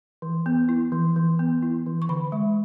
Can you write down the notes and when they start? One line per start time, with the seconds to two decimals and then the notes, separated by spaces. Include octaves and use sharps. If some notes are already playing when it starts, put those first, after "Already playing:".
0.22 E3
0.46 B3
0.69 E4
0.92 E3
1.16 E3
1.39 B3
1.62 E4
1.86 E3
2.02 C#6
2.09 D3 B5
2.32 G#3